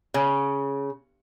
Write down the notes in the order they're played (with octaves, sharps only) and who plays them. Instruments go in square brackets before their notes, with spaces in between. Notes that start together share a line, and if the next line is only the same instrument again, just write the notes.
[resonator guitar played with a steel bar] C#3